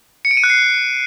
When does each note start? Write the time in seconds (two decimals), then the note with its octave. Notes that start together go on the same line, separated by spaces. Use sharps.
0.25 C#7
0.31 D7
0.37 D#7
0.44 F#6
0.50 C7